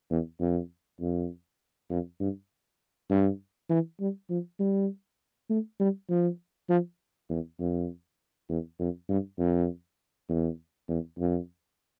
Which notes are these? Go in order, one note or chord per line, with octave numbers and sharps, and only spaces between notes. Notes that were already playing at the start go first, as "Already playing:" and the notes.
E2
F2
F2
F2
G2
G2
E3
G3
F3
G3
A3
G3
F3
F3
E2
F2
E2
F2
G2
F2
E2
E2
F2